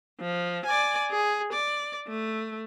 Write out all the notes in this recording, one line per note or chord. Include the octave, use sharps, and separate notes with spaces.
F3
D5 G#5
G#4
D5
A3